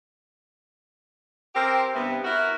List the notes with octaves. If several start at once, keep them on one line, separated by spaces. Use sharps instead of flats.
C4 G4 A#4 C5
G2 C3 B3
E4 F#4 A#4